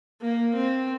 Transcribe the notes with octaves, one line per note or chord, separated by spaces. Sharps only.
A#3
C4